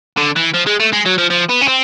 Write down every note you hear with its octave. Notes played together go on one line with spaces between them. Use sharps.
D3
E3
F3
G#3
A3
G#3
F#3
F3
F3
B3
C#4
C4